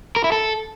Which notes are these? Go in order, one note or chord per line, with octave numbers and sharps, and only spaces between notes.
A#4
E4
A4